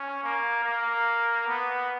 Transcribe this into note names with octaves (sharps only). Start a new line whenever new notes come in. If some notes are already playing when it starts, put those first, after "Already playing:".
Already playing: C#4
A#3
A#3
B3